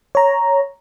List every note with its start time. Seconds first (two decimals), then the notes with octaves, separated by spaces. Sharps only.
0.15 C#5 A#5